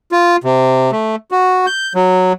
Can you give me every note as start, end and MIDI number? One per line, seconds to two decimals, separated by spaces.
0.12 0.36 65
0.44 0.91 48
0.92 1.16 57
1.31 1.66 66
1.67 1.93 91
1.95 2.33 54